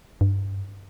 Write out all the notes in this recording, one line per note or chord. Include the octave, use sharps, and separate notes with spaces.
G2